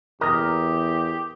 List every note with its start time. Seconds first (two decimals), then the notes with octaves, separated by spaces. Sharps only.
0.21 E2 G4 A#4 D#6 A#6